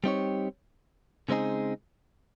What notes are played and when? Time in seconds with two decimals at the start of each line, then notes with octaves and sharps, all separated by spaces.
0.04 G3 C4 D#4 G4 C#5
1.29 C#3 G#3 C4 D#4 G#4